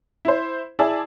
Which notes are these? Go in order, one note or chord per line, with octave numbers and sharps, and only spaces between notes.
E4 C5
E4 G#4 D5 A5 E6